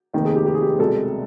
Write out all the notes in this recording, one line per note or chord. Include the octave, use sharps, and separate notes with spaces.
F1 D#2 D#3
G#4
G4
G4
G#4
G4
C2 B2 G#3 A4